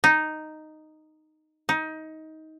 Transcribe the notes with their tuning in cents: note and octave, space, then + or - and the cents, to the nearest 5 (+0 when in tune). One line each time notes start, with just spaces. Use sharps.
D#4 -5
D#4 +20